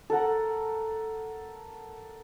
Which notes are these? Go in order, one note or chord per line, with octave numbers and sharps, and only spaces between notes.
A4 A#4 F#5 A#5